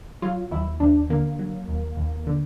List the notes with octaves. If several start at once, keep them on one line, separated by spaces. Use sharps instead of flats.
F#3 F4
D#2 E4
D#2 D4
D3 A#3
F#3
D#2
D#2
D3